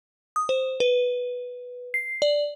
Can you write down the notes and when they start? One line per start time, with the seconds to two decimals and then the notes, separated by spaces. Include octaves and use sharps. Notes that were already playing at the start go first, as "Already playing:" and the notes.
0.36 D#6
0.49 C5
0.80 B4
1.94 C7
2.22 D5